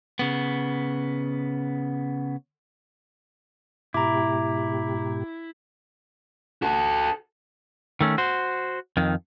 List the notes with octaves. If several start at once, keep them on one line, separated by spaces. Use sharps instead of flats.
C#3 B3
G#2 B2 E4 G4 A#5 D6
F#4 A4
D#3 A3 C#4
F#4 C5
F2 D#3